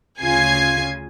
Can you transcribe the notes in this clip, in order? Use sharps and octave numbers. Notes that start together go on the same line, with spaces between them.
D2 C#3 F4 G#5 G#6 C7